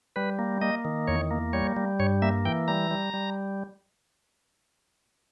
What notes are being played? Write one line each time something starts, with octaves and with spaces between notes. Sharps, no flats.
G3 B4
A#3
A#3 D#5
D#3
E2 C#5
A#3
G3 C#5
G3
G2 C#5
A#3 E5
E3 G5
G3 A#5
G3
G3